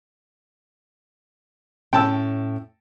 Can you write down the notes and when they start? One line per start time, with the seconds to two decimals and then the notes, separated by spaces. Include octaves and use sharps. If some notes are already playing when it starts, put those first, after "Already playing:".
1.93 A2 C#4 G5 A5 E6